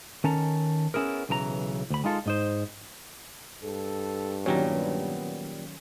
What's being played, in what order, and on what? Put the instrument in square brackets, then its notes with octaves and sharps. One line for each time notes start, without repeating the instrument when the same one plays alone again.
[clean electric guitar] D#3 C#4 A4 A#5
B3 C#4 E4 G#4 A#4
B1 C#3 E3 C5 A#5
D2 B5
G#3 D#4 F4 A4
G#2 D#4 C5
[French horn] G2 [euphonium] A4
[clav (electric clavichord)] A#2 G3 A#5 [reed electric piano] D#3 F#3 C#4 [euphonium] B3